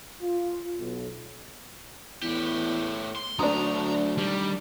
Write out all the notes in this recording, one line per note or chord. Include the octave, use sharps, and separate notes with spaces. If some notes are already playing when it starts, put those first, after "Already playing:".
F4
B1
E2 A2 G4
C6
D2 F#3 A3 D4 A#5 D#6
D#3 G3